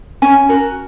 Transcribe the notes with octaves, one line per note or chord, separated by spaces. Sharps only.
C#4 G#5
F#4 A#4